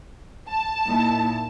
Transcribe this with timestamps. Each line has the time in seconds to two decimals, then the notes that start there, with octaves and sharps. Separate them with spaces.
0.49 A5
0.86 A#2 D#4 E4